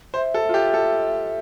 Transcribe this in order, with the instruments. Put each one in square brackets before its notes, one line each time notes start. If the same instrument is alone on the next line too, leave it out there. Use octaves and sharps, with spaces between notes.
[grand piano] C5 [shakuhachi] E5
[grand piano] A4
F4
G4
A4